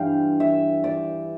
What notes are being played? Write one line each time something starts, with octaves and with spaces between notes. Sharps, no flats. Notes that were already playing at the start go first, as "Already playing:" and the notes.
Already playing: G2 E3 F5 G5
E5
D5